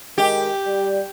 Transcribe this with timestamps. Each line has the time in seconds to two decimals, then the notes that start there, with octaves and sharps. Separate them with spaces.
0.18 D#3 G#3 G4
0.66 G3